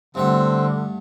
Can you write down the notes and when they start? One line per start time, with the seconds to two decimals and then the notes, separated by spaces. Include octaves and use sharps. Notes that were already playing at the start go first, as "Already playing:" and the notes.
0.15 G2 D3 A3 C4 F#5